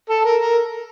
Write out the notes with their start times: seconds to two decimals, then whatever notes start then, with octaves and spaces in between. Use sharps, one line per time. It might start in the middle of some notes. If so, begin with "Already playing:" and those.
0.10 A4
0.25 A#4
0.41 A#4